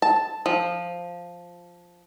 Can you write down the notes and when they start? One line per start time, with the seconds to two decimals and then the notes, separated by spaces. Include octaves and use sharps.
0.02 A5
0.46 F3